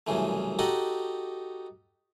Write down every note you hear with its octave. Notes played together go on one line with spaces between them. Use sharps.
C2 F#2 C#3 E3 A3
D#4 F#4 G4 A4 D#5 F#5